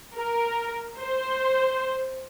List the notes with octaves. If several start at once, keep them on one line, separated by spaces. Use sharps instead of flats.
A#4
C5